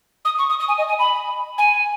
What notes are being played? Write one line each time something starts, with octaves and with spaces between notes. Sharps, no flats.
D#6
C#6
D#6
D#6
G#5
D#5
G#5
B5
G#5